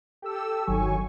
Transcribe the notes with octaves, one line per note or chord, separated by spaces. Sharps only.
G4 A4 E6
G1 D#3 F#3 G#5 C#6